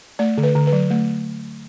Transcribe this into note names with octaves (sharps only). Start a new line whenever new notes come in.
A3 D5
D3
B4
D3
B4
F#3
A3